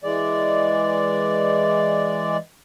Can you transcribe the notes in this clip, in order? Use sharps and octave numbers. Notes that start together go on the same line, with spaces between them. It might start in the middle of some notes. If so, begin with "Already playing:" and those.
E3 G#3 D5